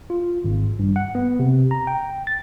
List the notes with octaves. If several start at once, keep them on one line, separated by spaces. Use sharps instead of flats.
F4
G#1
G2
F#5
B3
C3
A#5
G5
A6